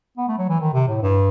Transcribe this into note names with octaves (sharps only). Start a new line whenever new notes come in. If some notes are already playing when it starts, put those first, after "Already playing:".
B3
A3
F#3
E3
D#3
C3
A2
G2